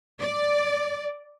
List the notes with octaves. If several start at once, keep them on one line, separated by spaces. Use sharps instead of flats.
D5